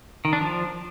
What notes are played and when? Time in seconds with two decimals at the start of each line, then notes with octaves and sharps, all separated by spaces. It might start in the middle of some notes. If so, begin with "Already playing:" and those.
0.25 D#3
0.33 D4
0.41 F3